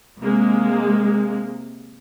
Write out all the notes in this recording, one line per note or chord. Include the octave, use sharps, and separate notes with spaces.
C3 G#3 A#3